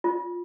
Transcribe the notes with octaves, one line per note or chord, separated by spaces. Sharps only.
F4